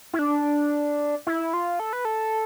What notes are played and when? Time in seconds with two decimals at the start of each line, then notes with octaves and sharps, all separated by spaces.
0.13 E4
0.19 D4
1.27 E4
1.53 F4
1.79 A4
1.93 B4
2.05 A4